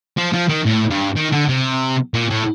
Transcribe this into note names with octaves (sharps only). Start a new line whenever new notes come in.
F3
F3
D#3
A2
G2
D#3
D3
C3
A#2
A2